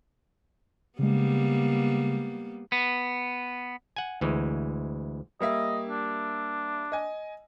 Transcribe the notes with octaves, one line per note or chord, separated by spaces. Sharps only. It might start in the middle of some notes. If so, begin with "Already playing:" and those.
C#3 G3 G#3 A#3 B3
B3
F#5 G#5
D2 E3 G#3
G3 A#3 D#5 E5
D4
D#5 G#5